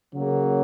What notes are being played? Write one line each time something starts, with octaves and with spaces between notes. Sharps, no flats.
C#3 F#3 A#3